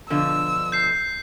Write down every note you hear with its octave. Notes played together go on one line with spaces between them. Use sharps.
B2 D3 F3 E6
G6 C7